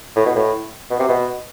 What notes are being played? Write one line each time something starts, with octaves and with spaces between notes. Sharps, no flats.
A2
B2
A2
B2
C3
B2